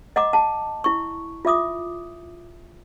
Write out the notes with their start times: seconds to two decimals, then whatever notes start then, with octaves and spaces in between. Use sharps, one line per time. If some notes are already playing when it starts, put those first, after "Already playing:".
0.16 D#5 F#5 A#5 D6
0.33 F#5 A5
0.84 E4 C#6
1.45 F4 E5 D6 D#6